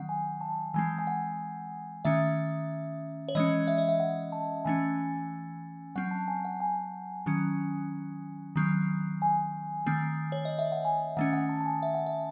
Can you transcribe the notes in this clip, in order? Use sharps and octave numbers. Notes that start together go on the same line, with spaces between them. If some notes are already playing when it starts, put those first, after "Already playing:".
Already playing: D#3 F#3 C4 F#5
G#5
A5
E3 G#3 C4 G#5
G#5
F#5
D#3 A3 C#4 E5
C#5
E3 G#3 C#4 D#5
E5
D#5
E5
F#5
A5
E3 A3 C#4 G#5
F#3 C4 F#5
A5
G#5
F#5
G#5
D#3 F#3 C#4
D#3 F#3 C4
G#5
D#3 A3 C4
C#5
D#5
E5
F#5
G#5
D#3 A3 C#4 F#5
F#5
A5
A5
G#5
E5
F#5
E5